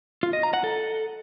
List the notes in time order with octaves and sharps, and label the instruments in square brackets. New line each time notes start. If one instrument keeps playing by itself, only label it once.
[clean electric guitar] F4
D#5
A#5
F#5
A4